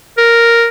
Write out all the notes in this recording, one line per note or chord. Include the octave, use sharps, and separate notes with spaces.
A#4